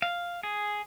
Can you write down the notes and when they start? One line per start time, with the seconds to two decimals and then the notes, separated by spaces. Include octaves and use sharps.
0.02 F5
0.43 G#4